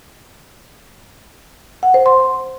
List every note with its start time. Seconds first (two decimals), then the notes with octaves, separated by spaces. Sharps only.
1.83 F#5
1.94 C5
2.06 C6